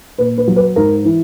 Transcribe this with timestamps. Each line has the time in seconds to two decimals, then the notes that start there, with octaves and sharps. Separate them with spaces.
0.18 A#2 B4
0.38 B4
0.48 F#3
0.56 B4
0.76 G#2 A#4
1.04 E3